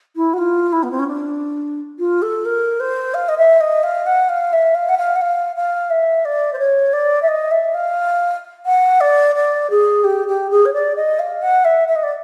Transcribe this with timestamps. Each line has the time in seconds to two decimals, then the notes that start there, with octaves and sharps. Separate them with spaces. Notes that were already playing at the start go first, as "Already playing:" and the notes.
0.16 E4
0.33 F#4
0.38 F4
0.72 E4
0.83 B3
0.91 C4
0.99 C#4
1.07 D4
1.99 F4
2.22 A4
2.45 A#4
2.80 C5
3.14 F5
3.28 D#5
3.37 E5
3.60 D#5
3.83 F5
4.06 F#5
4.29 F5
4.53 E5
4.74 F5
4.89 F#5
4.97 F5
5.15 F#5
5.21 F5
5.56 F5
5.90 E5
6.25 D5
6.53 C5
6.59 C#5
6.93 D5
7.22 E5
7.28 D#5
7.51 E5
7.74 F5
8.65 F#5
9.00 D5
9.35 D5
9.70 G#4
10.04 G4
10.27 G4
10.50 G#4
10.65 C#5
10.73 D5
10.96 D#5
11.19 F5
11.42 F#5
11.64 E5
11.88 E5
11.95 D#5
12.03 D5